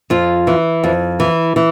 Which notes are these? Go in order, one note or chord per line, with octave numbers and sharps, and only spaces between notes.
F2 F4
E3
F2
E3
E3